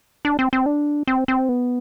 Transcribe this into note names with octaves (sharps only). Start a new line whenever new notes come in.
D4
C4
C4
D4
C4
C4
B3